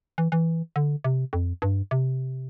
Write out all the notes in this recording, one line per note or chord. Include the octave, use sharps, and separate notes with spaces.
E3
E3
D3
C3
F2
G2
C3